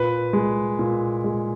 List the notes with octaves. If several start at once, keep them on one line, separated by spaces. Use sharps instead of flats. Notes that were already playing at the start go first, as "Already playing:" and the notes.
Already playing: A#2 B4
G#3
A#2
G#3